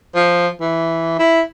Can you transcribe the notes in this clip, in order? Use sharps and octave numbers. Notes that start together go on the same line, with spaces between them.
F3
E3
E4